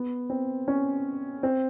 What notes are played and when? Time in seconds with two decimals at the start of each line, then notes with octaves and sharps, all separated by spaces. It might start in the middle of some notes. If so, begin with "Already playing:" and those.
Already playing: B3
0.30 C4
0.68 C#4
1.43 C4